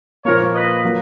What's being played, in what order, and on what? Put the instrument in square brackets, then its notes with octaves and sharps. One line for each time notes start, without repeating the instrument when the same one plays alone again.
[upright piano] A#2 F3 A#3 [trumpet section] A#4 C#5
[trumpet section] B4 D#5
[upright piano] F#3 A#3